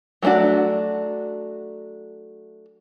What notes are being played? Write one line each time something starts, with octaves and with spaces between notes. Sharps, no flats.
F#3 A3 C4 D4 F#4